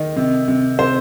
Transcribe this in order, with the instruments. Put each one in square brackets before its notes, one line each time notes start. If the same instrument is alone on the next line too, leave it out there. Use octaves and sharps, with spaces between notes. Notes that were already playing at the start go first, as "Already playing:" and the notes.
Already playing: [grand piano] D#3 D#4
C3
C3
C3 C5